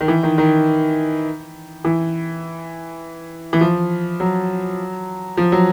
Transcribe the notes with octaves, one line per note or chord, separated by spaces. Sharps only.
D#3
E3
D#3
D#3
E3
E3
F3
F#3
F3
F#3